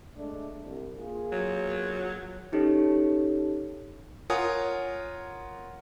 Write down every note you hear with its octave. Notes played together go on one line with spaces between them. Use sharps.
G#3 A3 D4
C2
A#3 F4 G#4
F#3
C#4 D#4 G4 A4 C#5
F4 A#4 C#5 F#5 G#5 D#6